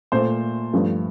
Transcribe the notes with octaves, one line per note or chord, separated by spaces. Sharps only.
A#2 A3 C5
G2 F3 A3